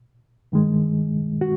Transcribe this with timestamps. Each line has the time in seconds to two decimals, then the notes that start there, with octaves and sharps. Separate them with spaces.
0.52 G2 D#3 G#3
1.41 F#4